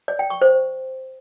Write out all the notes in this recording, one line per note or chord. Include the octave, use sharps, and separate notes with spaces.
D5
G5
C#6
C5